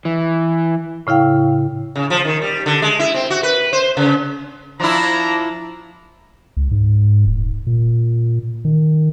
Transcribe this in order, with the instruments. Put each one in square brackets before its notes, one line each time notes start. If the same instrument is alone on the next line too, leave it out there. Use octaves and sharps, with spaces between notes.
[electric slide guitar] E3
[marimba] A2 C#3 E4 F5 G5
[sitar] C#3
F3
D#3
G3
D3
G#3
E4
C4
F#4
B4
C5
C#3
[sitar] F3 E4 [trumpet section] D4 A#5
[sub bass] C#2
G#2
D#1
A#2
D#3